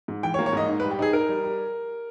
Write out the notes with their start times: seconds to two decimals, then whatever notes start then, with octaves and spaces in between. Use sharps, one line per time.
0.08 G#2
0.23 E3 G5
0.34 C#5
0.39 A#3
0.46 C#5
0.53 G#2 D#5
0.68 D#4
0.80 B4
0.84 G3
0.91 G4
0.99 D#4 G#4
1.13 D#4 A#4
1.29 G3
1.44 G3